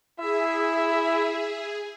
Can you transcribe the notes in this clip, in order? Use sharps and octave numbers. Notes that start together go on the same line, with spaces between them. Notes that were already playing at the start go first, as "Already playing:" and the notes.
E4 G#4 E5